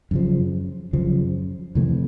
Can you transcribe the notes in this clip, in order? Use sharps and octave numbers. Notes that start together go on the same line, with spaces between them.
F#2 C#3 F3
F#2 C#3 F3
F2 C3 E3 A3